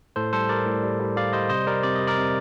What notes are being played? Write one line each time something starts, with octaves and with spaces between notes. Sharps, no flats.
A2 A4 C5
G3 A4 C5
G3 A#4 D5
A2
G3
G3
G3 D5 F5
G3 C5 D#5
C3 C5 D#5
G3 A#4 D5
C3 D5
D#5
G3
A#4 D5
C3